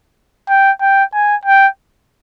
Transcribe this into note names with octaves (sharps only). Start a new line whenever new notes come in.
G5
G5
G#5
G5